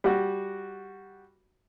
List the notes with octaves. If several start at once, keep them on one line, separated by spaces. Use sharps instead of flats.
G3 F#4